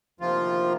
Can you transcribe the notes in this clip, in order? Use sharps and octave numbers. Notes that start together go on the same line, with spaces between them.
D2 C3 D#3 F3 A#3 F4